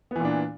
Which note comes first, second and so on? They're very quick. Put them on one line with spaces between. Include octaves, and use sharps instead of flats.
B3 E3 A#2 D4